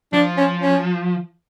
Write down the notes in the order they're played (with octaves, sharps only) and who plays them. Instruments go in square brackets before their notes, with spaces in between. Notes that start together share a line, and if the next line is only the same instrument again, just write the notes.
[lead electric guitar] F3 [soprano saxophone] D4
[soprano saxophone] C#4
C#4